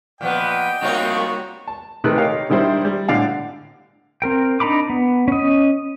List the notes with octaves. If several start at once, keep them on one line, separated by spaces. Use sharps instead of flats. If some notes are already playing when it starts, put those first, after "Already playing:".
A#2 F3 B3 D#5 G5
C2 G3 A#3 D#4 F4 F#4 C#5
A5
C3 D#3 A3 B4 F#6
D#4 G4 A#4 C#5 F5
D3 D#3 G3 E4 C5
G3
A2 D3 D4 F5 F#5
C4 A#4 G5
D4 D#4 A#5 B5 D6
B3
C#4 D#5